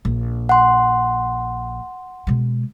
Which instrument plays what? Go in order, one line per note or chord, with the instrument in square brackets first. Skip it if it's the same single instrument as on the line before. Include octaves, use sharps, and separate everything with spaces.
[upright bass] A#1
[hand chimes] F#5 C6
[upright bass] B2 G#3